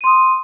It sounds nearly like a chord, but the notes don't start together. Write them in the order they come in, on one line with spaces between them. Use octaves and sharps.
D#7 C6 D#6